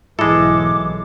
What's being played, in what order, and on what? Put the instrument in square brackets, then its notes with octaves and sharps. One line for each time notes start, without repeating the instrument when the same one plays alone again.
[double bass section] B1 E3 [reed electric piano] G#2 E4 [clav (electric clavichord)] G#3 A4 [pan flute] D6